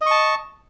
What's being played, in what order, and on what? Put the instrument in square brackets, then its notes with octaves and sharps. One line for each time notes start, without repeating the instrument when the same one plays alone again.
[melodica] D#5
C#6
A5